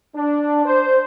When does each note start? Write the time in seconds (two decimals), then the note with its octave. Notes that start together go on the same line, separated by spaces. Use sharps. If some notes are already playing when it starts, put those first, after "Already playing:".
0.15 D4
0.65 C5